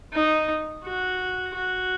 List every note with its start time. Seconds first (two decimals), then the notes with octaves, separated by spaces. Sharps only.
0.13 D#4
0.84 F#4
1.54 F#4